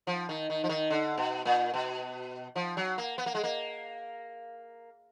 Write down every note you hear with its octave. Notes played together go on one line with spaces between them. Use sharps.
F3
D#3
D#3
F3
D#3
D3
B2
A#2
B2
F3
F#3
A#3
B3
A#3
G#3
A#3